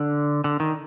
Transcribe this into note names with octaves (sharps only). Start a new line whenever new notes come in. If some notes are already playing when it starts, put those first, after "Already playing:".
Already playing: D3
D3
D#3